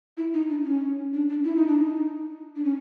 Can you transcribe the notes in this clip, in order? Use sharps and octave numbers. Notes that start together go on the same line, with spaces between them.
E4
D#4
D4
C#4
D4
D4
E4
D#4
D4
D#4
D4
C#4